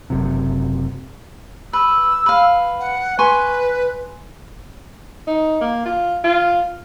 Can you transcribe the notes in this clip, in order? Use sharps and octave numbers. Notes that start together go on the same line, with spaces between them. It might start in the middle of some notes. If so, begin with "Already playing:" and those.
F#1 F#2 C3
B4 E6
B4 F5
F#5
B4 G#5 C6 C#6
D#4
A#3
F4
F4